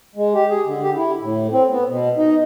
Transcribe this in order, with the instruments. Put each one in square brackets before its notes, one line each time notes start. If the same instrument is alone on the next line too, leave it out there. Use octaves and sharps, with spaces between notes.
[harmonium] G#3
G4
G#4
D3
G4
E4
A2
C4
B3
B2
D#4